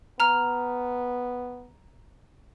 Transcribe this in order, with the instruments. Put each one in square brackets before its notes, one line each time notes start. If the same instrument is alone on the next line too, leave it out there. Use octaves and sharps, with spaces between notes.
[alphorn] B3 [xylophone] A#5 F6